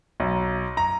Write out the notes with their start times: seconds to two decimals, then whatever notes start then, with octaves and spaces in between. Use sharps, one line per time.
0.20 B1
0.77 A#5